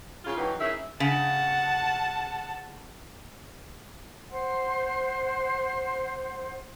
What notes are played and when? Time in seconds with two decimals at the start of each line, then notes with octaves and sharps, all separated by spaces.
0.25 F#2 C#3 F#3 F4
0.37 D3 E3 F#3 B3 D#4 G4
0.59 C#4 D#4 E4 G#4 A#4 E5
1.00 C#3 F#5 A5
4.31 C5 F#5 C6